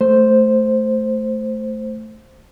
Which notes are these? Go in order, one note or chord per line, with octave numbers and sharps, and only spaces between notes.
A3 C5